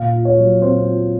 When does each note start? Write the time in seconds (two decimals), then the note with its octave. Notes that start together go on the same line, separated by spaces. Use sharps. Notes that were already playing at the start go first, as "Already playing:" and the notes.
Already playing: A#2 F5
0.13 F4
0.25 C#5
0.38 F#3
0.61 C4 C5
0.86 F4